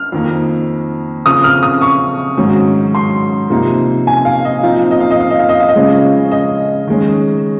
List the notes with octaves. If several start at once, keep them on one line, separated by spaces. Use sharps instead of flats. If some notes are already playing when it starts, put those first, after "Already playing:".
Already playing: F6
F2 D#3 A#3
C#3 F3 C4 D#6
F6
D#6
C#6
G#2 D#3 F#3 C#4
C6
C3 F3 A#3 D#4
G#5
F5
D#5
A#2 F3 C4 D#4 F5
D#5
F5
D#5
F5
D#5
F5
D#5
F5
D#5
C#3 F3 G#3 C#4
D#5
D#3 G#3 C#4